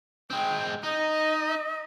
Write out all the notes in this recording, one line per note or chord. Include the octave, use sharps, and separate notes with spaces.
G#3 C4 G5
D#4 D#5